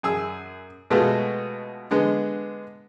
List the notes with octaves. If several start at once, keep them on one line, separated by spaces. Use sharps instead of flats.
F#2 G#4 E6
B2 G#3 A3 B3 F4 F#4
D3 G#3 B3